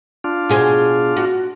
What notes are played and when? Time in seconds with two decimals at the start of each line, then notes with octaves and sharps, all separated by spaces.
0.24 D4 F4
0.49 B2 G#4 C5
1.16 F#4